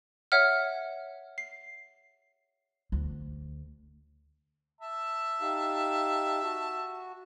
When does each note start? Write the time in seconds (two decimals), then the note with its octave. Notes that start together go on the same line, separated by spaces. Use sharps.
0.32 C#5 E5 F#5 F6
1.38 C7
2.92 D2
4.81 E5 A5
5.41 D#4 G4 F5
6.44 F#4